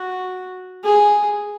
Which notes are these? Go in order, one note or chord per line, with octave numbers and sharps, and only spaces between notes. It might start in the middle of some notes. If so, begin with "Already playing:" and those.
Already playing: F#4
G#4